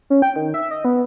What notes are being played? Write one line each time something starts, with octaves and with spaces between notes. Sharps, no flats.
C#4
G5
D#3
E5
D#5
B3